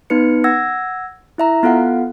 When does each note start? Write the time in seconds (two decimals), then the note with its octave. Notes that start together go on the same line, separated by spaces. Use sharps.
0.10 B3 D#4 B4 C#7
0.44 F#5 E6 G#6 A#6
1.38 E4 E5 A#5
1.63 B3 F4 A4 F5 F#5